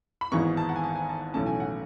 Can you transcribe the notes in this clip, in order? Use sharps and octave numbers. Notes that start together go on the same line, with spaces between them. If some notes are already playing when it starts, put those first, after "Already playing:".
B5
G#1 G#2 E3 G#3 B3 C#6
A5
F#5
G#5
A5
G#5
A5
B1 A2 E3 A3 C#4 A5
G#5
F#5